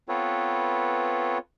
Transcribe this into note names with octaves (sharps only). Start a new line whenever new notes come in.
B3 C4 F4 A4 B4 C#5